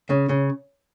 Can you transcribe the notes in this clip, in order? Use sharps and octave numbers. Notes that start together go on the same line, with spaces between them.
C#3
C#3